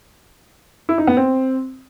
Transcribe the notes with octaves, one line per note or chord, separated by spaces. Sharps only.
E4
D#4
B3
C4